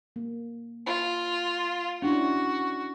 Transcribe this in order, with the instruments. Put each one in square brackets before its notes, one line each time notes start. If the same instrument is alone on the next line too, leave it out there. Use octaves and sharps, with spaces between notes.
[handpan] A#3
[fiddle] F4
[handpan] C#4 D4 E4 [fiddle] F#4